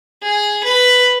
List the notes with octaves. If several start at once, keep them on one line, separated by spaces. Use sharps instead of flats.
G#4
B4